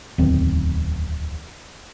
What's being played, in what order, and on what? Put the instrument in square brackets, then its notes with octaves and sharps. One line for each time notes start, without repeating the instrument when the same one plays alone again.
[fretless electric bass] D1 E2 D#3 C4